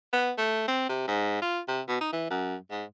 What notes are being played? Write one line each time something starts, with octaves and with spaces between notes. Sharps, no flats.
B3
A3
C4
C3
G#2
F4
C3
B2
D#4
E3
F#2
G#2